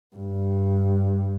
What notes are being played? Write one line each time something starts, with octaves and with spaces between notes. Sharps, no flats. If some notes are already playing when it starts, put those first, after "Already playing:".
G2